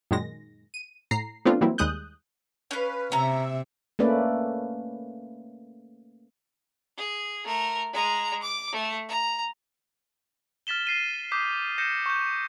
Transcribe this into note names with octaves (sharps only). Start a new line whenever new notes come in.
F#2 A#2 D#3 G#3 A#6
D#7
A2 A#5 C7
F3 A3 B3 C4 D4 F4
E3 F#3 G3 A#3 C4 E4
D#2 G3 G#3 D#6 F#6 G6
C#4 B4 F5
C3 C#4 E5 A#5
A3 A#3 C#4 B4 D5
G#4
A3 A#4
G#3 A#5
D6
A3
A#5
F6 A6 B6 E7 G7
A6 C7 D#7
D6 D#6 G6 B6 C7
G6 A#6 C#7 E7
C#6 G6